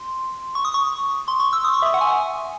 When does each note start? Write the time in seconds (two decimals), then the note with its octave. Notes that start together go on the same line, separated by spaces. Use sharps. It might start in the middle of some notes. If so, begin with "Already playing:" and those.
Already playing: C6
0.55 C#6
0.65 D#6
0.74 C#6
1.28 C6
1.40 C#6
1.53 E6
1.64 D#6
1.74 C#6
1.82 E5
1.94 F#5
2.01 G#5